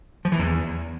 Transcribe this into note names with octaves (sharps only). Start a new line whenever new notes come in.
F3
E3
E2